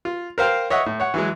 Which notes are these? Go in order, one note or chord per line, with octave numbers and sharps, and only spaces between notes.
F4
A#4 C5 F5 G5
C#5 D#5 E5 F#5
A2
C#5 F#5
E3 F#3 G#3